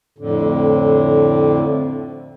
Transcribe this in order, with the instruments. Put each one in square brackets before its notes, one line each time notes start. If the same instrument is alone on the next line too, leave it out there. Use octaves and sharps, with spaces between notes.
[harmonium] F2 A2 D3